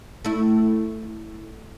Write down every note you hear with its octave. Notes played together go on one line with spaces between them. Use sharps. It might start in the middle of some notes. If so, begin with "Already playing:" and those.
A3 E4